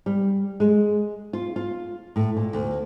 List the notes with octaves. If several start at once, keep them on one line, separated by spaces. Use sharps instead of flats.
G3
G#3
F4
F4
A2
A#2
D2